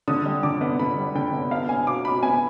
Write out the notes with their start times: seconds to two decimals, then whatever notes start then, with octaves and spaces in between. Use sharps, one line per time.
0.08 D3 D#6
0.26 G3
0.43 D3 D6
0.61 B3
0.79 D3 B5
0.97 G3
1.15 D3 G5
1.33 B3
1.51 B3 F5
1.69 B3 G#5
1.87 B2 D6
2.05 B2 B5
2.23 B3 G#5